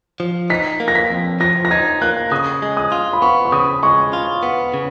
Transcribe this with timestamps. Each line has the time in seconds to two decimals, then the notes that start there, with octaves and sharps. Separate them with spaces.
0.20 F3
0.50 D#4 B6
0.80 A#3
0.88 A#6
0.95 B6
1.10 F2
1.40 F3 A#6
1.65 A#6
1.71 D#4 G#6
2.02 A#3 F#6
2.31 C#3 D#6
2.62 G#3
2.77 D#6
2.92 F4
3.13 B5
3.22 B3 C#6
3.45 C#6
3.52 C#3 D#6
3.83 G#3 C#6
4.13 F4
4.43 B3
4.74 C#3